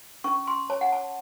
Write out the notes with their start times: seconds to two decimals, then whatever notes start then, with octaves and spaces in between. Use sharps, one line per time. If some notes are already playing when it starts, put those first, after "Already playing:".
0.24 C#4 C#6
0.47 C6
0.70 C#5 A5
0.81 F#5
0.93 A5